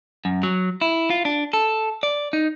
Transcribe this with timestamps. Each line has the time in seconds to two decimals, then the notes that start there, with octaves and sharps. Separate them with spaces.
0.25 F#2
0.43 F#3
0.81 E4
1.10 F4
1.25 D4
1.53 A4
2.03 D5
2.33 D#4